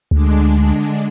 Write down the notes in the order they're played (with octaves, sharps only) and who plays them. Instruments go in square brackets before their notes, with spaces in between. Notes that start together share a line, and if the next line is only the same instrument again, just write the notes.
[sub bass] D2 [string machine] D3 G#3 D4